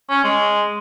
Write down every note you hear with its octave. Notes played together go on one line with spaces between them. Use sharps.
C#4
G#3